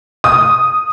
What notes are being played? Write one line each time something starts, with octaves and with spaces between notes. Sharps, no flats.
D#6